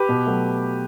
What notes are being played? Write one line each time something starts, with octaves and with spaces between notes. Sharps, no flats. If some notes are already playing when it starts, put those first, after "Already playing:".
Already playing: G4 B4
B2
F#3 A3